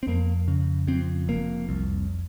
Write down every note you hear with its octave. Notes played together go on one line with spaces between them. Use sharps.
C4
F2 A#3
C#3
F2 C4
F1 A#3
C2